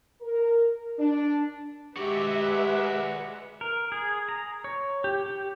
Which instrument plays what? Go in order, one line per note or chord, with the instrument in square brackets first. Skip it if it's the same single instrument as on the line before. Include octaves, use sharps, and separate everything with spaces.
[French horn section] A#4
D4
[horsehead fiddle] G#3 B4 [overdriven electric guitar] F#4 D5 [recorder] G4 [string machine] E5
[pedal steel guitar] A#4
G#4
A#5
C#5
G4
G4